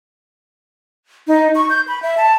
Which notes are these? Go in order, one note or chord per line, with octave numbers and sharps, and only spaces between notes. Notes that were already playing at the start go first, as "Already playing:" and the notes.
D#4
C#6
G6
B5
E5
A5